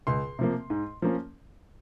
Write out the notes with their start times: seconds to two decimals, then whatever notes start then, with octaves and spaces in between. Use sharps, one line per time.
0.07 C#2 C6
0.39 C3 F3 A#3
0.70 G#2
1.02 F3 A#3 C#4